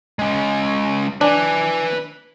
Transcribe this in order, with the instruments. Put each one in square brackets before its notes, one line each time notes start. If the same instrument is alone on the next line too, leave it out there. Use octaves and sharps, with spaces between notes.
[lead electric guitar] G#3 C#4
[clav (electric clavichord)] D4 [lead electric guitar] B4 G#5